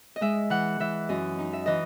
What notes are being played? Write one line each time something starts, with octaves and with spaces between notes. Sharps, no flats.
D#5
G#3 E5
E3 F#5
E3 E5
F#2 D#5
D#4
E5
E3 D#5